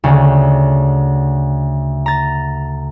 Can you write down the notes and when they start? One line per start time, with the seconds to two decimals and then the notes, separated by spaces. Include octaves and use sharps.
0.04 D2 C#3
2.06 A#5 A6